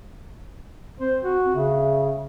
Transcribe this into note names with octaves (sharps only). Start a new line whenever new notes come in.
C4 C5
F#4
C#3 E5